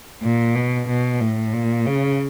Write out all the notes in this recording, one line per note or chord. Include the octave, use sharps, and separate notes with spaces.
A#2
B2
B2
A2
A#2
C#3